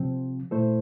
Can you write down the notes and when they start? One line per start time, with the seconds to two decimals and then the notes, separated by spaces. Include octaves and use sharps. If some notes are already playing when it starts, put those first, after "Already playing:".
Already playing: C3 F3 C4
0.51 A#2 A3 E4 A4 C5